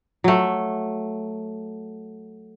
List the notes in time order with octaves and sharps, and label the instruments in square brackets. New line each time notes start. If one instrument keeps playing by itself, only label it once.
[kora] F#3 A3